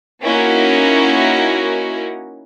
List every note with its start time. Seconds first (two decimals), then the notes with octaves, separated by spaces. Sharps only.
0.24 A#3 C#4 D#4 E4 F#4 A#4